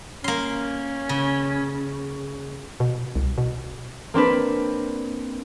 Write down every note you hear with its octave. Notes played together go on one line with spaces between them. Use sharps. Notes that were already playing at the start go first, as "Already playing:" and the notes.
A#3 C#4 C6
C#3
B2
C2
B2
A#3 C4 D4 B4